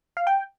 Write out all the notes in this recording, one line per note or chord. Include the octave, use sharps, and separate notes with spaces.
F5
G5